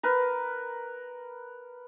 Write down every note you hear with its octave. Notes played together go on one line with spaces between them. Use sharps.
A#4 B4